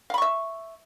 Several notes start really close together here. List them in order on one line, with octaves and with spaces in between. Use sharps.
F5 B5 C#6 E5